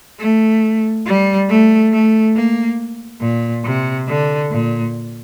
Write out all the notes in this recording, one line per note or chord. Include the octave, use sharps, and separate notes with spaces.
A3
G3
A3
A3
A#3
A#2
C3
D3
A#2